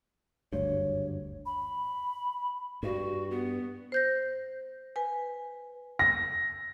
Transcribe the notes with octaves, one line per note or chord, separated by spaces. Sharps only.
F#1 D2 G2 C#5
B5
G2 F#4
B3
C5 G6 A#6
B4 G#5
A#6